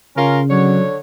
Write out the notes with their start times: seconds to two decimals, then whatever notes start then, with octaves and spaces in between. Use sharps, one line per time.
0.17 C#3 C#4 F4 A#4
0.50 D3 F#3 C#5